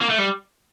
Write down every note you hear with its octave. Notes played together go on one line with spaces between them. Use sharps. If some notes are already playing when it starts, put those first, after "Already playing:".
A#3
A3
G3